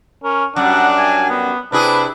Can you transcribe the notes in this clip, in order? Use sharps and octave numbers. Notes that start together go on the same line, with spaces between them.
C#4 A#4
F#2 G3 D4 F#5
G#5
B3
C3 D4 E4 G#4 B4